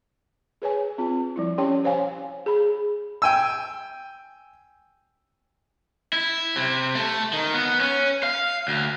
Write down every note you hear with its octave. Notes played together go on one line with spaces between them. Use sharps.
G#4 B4 C#5 G#5
C4 F4
F3 G3 E4
C#4 G4 C#5 G5 C6
C5 C#5 F5 G#5
G#4 B5
G5 G#5 E6
E4
C3
A3
D#3
B3
C#4
F5
D2